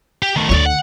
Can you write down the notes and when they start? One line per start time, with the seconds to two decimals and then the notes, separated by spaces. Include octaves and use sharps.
0.23 G4
0.36 D#3 A3
0.49 D2 D3 C#5 D5
0.66 F#5